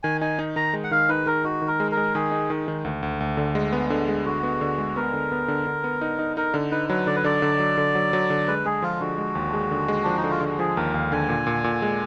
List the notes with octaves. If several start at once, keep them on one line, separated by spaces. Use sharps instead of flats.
D#3 G#5
D#4 G#5
D#4
D#3 A#5
G#3
F#5
D#3 F5
D#4 B4
D#3 A#4
D#4 F#4
D#3
A#4
G#3
A#4
G#3
D#3 G#4
D#4
D#3
D#3
D2
D2
D2
D3
G#3
B3
D3
G#3
D3 F#4
B3
D3
G#3
B3 A#4
D3
B3
D3
D3
B3
D#4
D#4
D#4 A#4
D3
D#4 B4
F#3 B4
D3 D5
B4
D3 D5
D3
F#3
D3
F#3
F#3
D3
G#3 B4
G#3 G#4
F3 F4
D3 F#4
G#3
D#2
G#3
D3
G#3
F3 D4
D#4
D3
F4
D3 F#4
F3 G#4
D#2 A#4
D#2 F5
D3 G#5
A#2
A#2
A#2
G#3